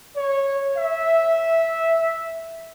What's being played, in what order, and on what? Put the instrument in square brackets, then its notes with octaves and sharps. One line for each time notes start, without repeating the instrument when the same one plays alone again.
[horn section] C#5
E5